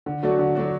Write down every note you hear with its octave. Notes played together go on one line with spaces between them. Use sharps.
D3
F#3 A3 D4 F#4
D3
F#3 A3 D4 F#4